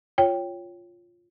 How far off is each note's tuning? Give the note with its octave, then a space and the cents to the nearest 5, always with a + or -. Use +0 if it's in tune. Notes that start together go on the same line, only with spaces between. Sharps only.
F4 +0 C#5 +0 G5 +0